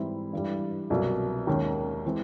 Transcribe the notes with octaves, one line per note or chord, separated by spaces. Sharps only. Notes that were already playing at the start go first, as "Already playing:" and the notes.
Already playing: G#2 E3 G3 C4 E4
G2 E3 G3
C2 B2 F#3 A#3
D#2 D#3 G#3 C#4
E3 G#3 C4